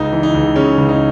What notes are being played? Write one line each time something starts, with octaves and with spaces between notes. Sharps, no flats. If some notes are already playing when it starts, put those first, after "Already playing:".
Already playing: C#2 D#4
E3
D#4
C#2
C#3 C#4
C#2
D#4